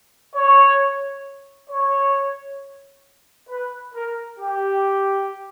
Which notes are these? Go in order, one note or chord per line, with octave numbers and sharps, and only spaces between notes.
C#5
C#5
B4
A#4
G4